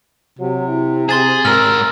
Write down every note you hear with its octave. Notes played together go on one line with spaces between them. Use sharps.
C3 F#3
E4
C4 G#4 C6 A6 E7
G#2 A#4 E6 F6